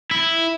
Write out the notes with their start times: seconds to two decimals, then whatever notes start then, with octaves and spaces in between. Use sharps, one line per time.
0.11 E4